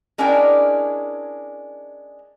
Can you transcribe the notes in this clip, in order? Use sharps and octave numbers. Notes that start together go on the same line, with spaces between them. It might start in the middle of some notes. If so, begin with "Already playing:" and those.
G#3 C#4 D4 E4 A#4 G5